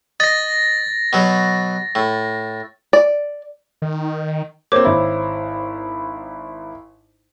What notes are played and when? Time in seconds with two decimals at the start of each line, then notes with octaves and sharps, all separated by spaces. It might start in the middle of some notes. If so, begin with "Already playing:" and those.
0.20 D#5 A6 A#6
1.13 B2 F#3
1.95 A2
2.93 D5
3.82 D#3
4.72 A#3 C4 C5 C#5 D6
4.85 G#1 E4